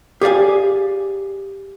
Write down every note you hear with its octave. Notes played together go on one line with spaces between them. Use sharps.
G4 G#4 D5 F5 G#5